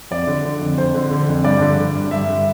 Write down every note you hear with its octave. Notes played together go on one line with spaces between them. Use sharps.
F2 D5
D3
D3
F2
F2 C5
D3
D3
F2
G2 D5
D3
D3
G2
G2 E5
D3